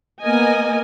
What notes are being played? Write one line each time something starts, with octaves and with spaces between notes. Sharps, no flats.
A#3 B3 A#4 D#5 G#5